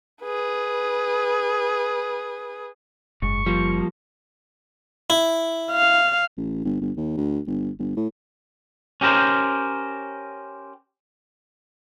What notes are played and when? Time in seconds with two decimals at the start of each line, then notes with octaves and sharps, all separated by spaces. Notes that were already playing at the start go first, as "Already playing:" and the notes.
0.23 G#4 B4
3.22 F#1 G#2 C#6
3.46 F3 G3 A#3
5.10 E4
5.71 F5
6.37 A1
6.65 G1
6.81 G1
6.97 D#2
7.17 D2
7.47 G1
7.79 G1
7.96 A2
9.01 C#4 G4 A#4 C5